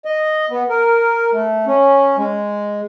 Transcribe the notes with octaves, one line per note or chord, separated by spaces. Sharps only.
D#5
B3
A#4
A3
C#4
G#3